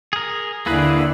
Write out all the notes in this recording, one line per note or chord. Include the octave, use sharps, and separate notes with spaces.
G#4 A#4
D#2 D3 A#3 E4 G#4 B4